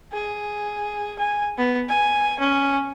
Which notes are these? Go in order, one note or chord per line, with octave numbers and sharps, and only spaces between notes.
G#4
G#5
B3
G#5
C#4